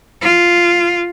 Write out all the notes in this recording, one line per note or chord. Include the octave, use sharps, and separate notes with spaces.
F4